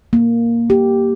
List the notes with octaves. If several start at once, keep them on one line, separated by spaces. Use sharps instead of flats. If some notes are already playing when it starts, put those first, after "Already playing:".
A#3
G4